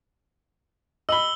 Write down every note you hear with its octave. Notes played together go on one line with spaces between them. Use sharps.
D#5 B5 E6 F#7 G7